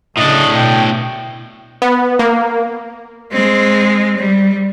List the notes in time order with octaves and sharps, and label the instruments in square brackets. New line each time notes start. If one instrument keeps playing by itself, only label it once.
[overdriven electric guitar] A2 D4 [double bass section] C#3 [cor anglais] D#5
[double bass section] B2 [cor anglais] G5
[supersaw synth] B3
A#3
[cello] G#3 C4
G3